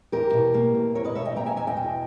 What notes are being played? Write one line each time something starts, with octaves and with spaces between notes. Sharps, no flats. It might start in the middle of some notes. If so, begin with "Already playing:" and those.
E2 G4 A#4
B2
A#3
E2
E2 A#4 C#5
B4 D#5
B2 C#5 E5
D#5 G5
A#3 G5 A#5
E5 G#5
E2 E5 G#5
D#5 G5
B2